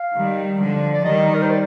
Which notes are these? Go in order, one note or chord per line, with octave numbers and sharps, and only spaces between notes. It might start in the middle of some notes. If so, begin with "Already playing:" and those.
Already playing: F5
D#3 G3
D3 F3
D5
D#3 G3 D#5
A#4
C5
D5